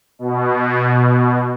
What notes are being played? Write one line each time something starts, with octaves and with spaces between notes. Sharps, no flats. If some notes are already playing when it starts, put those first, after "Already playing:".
B2